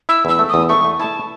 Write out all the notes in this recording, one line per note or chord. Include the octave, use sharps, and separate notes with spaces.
E4 E6
E2 E6
A3
E2 D#6
A3 C#6
A3
E4 A5